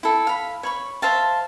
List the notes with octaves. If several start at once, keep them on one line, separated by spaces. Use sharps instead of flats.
E4 A4
F5 B5
C#5 B5 C#6
C5 E5 F5 A5